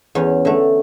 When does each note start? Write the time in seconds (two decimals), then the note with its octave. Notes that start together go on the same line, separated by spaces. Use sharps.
0.15 E2 C#4
0.45 D3 A3